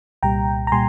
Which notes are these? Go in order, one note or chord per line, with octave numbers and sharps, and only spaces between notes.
C2 A#2 G3 G5 A#5
A#5
A#2 G3 G#5 C6